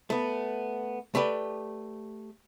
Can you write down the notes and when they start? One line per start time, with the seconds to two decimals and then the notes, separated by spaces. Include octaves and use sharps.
0.10 A3 B3
1.15 A3 G4 B4 D5